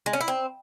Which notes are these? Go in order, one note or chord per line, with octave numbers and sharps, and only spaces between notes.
G#3
C#4
E4
C4